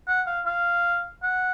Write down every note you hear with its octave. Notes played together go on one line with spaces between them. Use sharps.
F#5
F5
F5
F#5